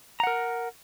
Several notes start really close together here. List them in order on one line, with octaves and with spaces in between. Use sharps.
A#5 F#5 A#4